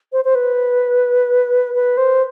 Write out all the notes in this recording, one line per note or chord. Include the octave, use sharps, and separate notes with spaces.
C5
C5
B4
B4
C5